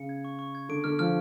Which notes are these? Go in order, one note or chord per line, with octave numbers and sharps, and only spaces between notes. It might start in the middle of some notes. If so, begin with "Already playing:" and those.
Already playing: C#3 C#7
G#6
C#6
C#6
G#6
D3 D7
D3 F6
F3 F6